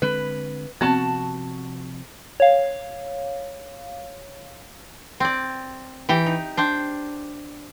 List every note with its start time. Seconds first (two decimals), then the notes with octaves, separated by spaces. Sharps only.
0.02 D3 G#3 C4 B4
0.81 C3 F3 B3 C4 F#4 A5
2.40 C#5 F5
5.20 C4 D5
6.09 E3 G4 G5
6.26 D#4
6.57 D4 C5 G5